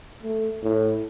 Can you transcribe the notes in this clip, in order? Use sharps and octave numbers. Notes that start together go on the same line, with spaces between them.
A3
A2